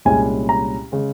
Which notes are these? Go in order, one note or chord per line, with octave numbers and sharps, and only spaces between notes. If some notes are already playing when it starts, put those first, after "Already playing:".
C2 A#2 G#3 C#4 G#5
A#5
C#3 G#3